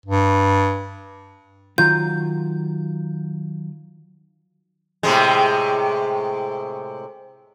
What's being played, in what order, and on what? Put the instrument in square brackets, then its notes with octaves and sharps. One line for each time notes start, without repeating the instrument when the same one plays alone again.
[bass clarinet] G2
[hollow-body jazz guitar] D#3 F#3 F4 [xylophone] G6
[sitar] A2 C3 G#3